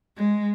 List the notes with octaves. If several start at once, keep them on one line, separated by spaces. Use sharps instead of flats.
G#3